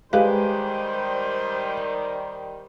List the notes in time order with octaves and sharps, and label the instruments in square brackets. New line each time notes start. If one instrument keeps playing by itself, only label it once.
[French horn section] D#3 G3 [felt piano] G#3 G4 B4 [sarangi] C5 [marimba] F5